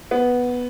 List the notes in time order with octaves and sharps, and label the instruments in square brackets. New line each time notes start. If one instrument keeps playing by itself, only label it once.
[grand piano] B3